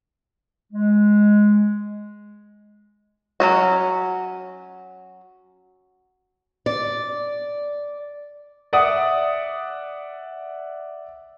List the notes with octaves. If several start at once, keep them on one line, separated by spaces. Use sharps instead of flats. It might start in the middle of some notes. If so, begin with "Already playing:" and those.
G#3
F#3 C#4 F#4
D5
D5 E5 F#5 D#6